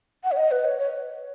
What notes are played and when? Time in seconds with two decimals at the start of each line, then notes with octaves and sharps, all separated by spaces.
0.24 F#5
0.32 C#5
0.37 D#5
0.51 B4
0.65 C#5
0.79 C#5